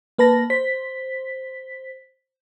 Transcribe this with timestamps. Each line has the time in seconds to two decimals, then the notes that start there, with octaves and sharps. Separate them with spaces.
0.18 A#3 B4 A5 A#6
0.50 C5 B6